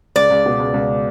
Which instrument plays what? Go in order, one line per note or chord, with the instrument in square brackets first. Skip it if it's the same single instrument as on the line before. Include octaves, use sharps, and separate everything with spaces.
[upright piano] C#2 [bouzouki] D5
[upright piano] C#2
B2
C#2
C#2